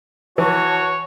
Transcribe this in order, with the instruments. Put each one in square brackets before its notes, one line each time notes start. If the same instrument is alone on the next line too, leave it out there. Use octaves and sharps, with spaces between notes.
[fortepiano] E3 [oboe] F#4 [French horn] C#5 [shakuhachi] A5